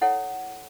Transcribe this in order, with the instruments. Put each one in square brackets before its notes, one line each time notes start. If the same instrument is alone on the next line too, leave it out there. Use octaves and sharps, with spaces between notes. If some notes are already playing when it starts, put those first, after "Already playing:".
[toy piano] E4 A4 C#5 F#5